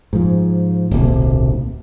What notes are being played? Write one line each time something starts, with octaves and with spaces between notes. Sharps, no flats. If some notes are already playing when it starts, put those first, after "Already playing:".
G#2 F3
D1 B1 C3 A#3